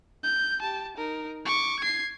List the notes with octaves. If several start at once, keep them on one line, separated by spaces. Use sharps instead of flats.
G6
G4 A5
D#4 A#4
C#6 D6
G#6 C7